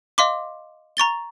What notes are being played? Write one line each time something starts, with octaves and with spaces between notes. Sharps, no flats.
D#5 F5 C6 D6
A#5 C#6 A6 G7